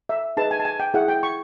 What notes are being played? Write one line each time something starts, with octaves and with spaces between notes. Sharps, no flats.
E5
D#4 G#4 B4 A5
G#5
A5
G#5
G5
E4 G#4 C#5 F#5
G5
C#6